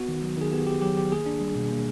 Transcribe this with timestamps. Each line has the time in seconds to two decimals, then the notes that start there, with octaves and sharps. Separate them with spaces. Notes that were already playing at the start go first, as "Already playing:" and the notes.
Already playing: B3 F#4
0.09 D#3
0.23 F#3
0.37 D#3 G#4
0.52 B3 G4
0.67 D#3 G4
0.81 F#3 G4
0.97 D#3 G4
1.12 A#3 G#4
1.26 D4
1.41 G3
1.56 B2
1.71 A#3